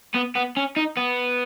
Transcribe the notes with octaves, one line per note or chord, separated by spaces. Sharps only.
B3
B3
C#4
D#4
B3